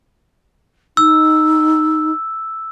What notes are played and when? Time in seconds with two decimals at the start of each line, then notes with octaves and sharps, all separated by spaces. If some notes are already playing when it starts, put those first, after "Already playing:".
0.97 D#4 E6